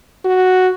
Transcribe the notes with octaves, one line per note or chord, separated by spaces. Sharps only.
F#4